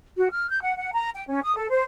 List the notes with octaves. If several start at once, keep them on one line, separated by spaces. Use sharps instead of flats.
F#4
F6
G6
F#5
F#5
A#5
G5
C#4
D#6
A4
C5